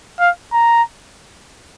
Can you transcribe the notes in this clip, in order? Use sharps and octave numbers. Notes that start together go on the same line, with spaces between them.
F5
A#5